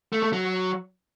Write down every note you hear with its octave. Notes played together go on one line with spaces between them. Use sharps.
A3
A3
F#3